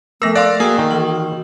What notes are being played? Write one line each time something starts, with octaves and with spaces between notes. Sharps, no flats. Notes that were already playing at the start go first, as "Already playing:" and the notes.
F3 A3 B3 A#4 E6 A#6
D5 F5 C6 F#6
A#3 F#4 G#4 G5 D#6 E6
D#3
E3 F#7